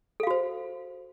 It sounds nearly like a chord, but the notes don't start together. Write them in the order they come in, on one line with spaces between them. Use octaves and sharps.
A4 F5 F#4 C5